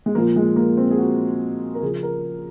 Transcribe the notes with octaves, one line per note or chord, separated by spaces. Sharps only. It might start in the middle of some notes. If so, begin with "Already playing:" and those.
G#3
A#2 F3 A#3
G#3
A#3
C4
G#4
F#4
A#4
C#3 F3 G#4
A#4